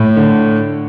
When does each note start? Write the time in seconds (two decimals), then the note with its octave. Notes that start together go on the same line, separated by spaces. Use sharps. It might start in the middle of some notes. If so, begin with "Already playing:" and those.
Already playing: A2
0.17 D3